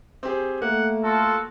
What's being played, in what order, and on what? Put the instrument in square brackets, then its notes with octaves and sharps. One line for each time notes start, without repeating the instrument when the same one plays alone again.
[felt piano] C4 G4 G#4
[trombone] A3 [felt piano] A#3 [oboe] F#5
[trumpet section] F4 A4 [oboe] F#4